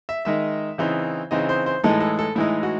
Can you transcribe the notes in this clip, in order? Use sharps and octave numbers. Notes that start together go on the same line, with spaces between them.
E5
D#3 G#3 D#4 E5
C#3 E3 C4 D#4
C#3 E3 C4 D#4 D#5
C5
C5
A2 E3 G#3 D#4 A4
A4
A4
A2 E3 G#3 D#4 E4
F#4